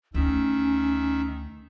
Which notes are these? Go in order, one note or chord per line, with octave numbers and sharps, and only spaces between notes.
D2 D#3 C#4 E5